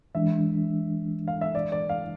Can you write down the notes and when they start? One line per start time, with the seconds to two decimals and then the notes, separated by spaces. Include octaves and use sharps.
0.15 E3 G#3 D4 E5
1.28 F5
1.41 E5
1.55 D5
1.72 D5
1.89 F5